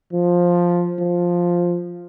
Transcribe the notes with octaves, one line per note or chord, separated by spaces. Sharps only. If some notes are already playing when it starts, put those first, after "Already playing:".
F3
F3